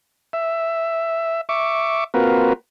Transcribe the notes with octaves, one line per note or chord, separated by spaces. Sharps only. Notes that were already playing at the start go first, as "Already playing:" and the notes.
E5
E5 C#6 D6
A#3 C4 F4 F#4 A#4 B4